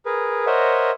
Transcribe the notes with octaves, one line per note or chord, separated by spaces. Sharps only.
G#4 A#4 B4
A#4 C5 C#5 D#5 E5 F#5